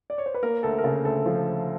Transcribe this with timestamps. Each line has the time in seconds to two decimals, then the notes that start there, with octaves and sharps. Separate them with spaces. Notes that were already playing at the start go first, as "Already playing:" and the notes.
0.10 D5
0.18 C#5
0.26 C5
0.34 B4
0.43 A#3 A#4
0.63 D2 A4
0.78 A#4
0.84 C#3 A4
1.05 D2 A4
1.26 F3